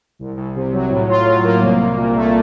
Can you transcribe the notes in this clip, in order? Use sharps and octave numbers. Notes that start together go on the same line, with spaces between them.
C2
C2
C3
F#3
A2
F4
F#3
A#3
C2
C2
A#2
A3